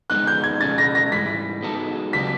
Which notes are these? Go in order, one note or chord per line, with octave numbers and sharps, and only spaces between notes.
G#3 B3 D#4 F#6
G6
G#6
B2 G#3 C#4 A6
A#6
A#6
G#2 E3 G3 B6
G#3 B3 D#4 F#4 A4
C#3 F#3 B3 D4 G4 B6